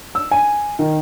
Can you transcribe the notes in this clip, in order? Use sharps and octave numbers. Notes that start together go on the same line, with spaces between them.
E6
G#5
D#3